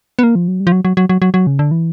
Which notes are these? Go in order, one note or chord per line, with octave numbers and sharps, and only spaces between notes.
B3
A#3
F3
F#3
G3
F3
F#3
F#3
F#3
F#3
F#3
F#3
C#3
D3
E3